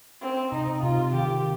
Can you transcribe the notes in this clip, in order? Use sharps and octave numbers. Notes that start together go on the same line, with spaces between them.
C4
C3 D#4
C3 F4
D#3 G4